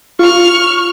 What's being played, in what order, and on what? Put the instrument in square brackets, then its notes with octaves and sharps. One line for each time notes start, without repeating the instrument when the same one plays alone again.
[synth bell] F4 [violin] C#6 F6